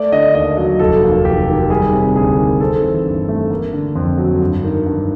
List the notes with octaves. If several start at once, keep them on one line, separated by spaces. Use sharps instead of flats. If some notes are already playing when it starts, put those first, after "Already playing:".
Already playing: A3 D5
D3 D#5
D#2 D#5
F#3 D#5
F1 A4
D#2
F1 G4
D#3
G3 G#4
C3
D2 G#4
D#3
C4 A4
E3
G2
A3
A#3
D3
F2
F#3
G2
D#3
G2